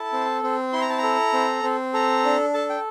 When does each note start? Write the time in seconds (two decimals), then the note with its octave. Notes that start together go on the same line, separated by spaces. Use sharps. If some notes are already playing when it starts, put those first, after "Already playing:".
Already playing: E4 A4 A5
0.13 C4
0.43 C4
0.73 E4 C6
0.82 A#5
0.90 A5
0.98 A#5
1.03 A4
1.34 C4
1.63 C4
1.94 A4 A#5
2.25 D4
2.54 A4 A5
2.70 G5